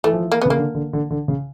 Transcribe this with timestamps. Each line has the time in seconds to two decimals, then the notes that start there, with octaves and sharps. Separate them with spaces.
0.04 E3 A3
0.13 F3
0.21 E3
0.32 A#3
0.42 B3
0.46 C#3 A#3
0.58 D3
0.75 D3
0.93 D3
1.11 D3
1.28 C#3